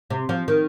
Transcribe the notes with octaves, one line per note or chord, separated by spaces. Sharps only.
C3
F3
D#3